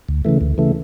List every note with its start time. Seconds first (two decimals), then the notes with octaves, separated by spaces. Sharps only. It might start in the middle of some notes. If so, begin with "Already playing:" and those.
0.09 D2
0.25 C#3 E3 A3
0.41 D2
0.58 C#3 E3 A3